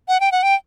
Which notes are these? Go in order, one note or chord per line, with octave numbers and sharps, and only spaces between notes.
F#5
G5
F#5
G5